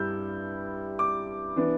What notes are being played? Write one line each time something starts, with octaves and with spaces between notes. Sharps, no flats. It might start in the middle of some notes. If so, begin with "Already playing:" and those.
Already playing: G2 G3 E4 E6 G6
D6
E3 B3 D4